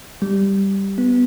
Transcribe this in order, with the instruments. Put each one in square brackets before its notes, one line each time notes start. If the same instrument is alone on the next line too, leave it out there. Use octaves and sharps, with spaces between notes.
[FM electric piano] G3
B3